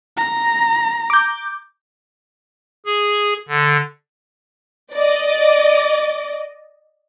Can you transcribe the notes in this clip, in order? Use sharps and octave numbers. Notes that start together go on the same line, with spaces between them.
A#5
D6 G6
G#4
D3
D5 D#5 D6